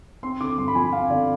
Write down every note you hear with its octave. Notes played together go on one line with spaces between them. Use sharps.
C4 C6
D3 D6
G2 C6
B5
F3 G#5
C4 F5
D3 D5